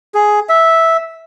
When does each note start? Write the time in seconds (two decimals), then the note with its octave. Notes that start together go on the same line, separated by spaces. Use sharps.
0.14 G#4
0.49 E5